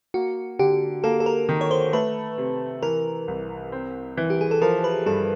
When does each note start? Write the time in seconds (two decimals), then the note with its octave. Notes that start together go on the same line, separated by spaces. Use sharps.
0.14 A#3 F#4
0.59 D3 G4
1.04 A#3 A4
1.20 A4
1.26 A#4
1.49 D#3
1.61 C#5
1.71 C5
1.93 A3 B4
2.38 C3
2.83 E3 A#4
3.28 C2
3.72 C4
4.17 E3
4.30 G4
4.41 G#4
4.51 A4
4.61 F3 A#4
4.84 B4
5.06 G2 A4